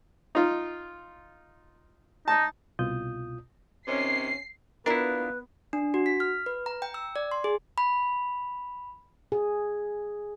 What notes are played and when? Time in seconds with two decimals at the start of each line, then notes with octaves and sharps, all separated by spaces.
0.35 D#4 F4
2.28 D#4 A5
2.79 C2 B2 F4 D#6 G6
3.88 C3 D#3 C#4 C7
4.86 B3 D4 E4 F4 A#4 B4
5.73 D4
5.94 F#4
6.06 B6
6.20 F6
6.46 B4
6.66 A#5
6.82 G5
6.94 E6
7.16 D5
7.31 C6
7.44 G#4
7.78 B5
9.32 G#4